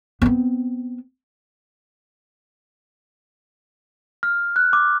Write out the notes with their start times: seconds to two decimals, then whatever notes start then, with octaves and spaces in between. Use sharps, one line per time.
0.22 B3 C4
4.23 F6
4.56 F#6
4.73 D6